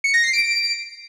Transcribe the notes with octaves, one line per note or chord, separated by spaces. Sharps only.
C#7
A#6
C7
D7